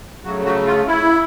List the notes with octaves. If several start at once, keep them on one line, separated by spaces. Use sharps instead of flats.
C#3 F#3 A3 F#4
F#3 F#4
F4
E4